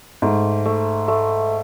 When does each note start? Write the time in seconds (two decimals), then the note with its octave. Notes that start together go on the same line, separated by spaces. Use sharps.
0.22 G#2 A3
0.65 A3
1.08 A3